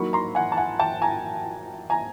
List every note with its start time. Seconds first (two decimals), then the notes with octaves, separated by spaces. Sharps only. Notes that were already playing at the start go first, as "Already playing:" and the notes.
Already playing: F#3 A#3 D#4 B5 C#6
0.13 A#5 C6
0.35 F#5 G#5
0.52 A5
0.57 F#5 G#5
0.79 G5 A5
1.02 G#5 A#5
1.90 G#5 A#5